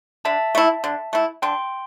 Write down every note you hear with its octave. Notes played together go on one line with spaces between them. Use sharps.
D3 E5 A5
A3 E4
D3
A3 E4
D3 G5 C6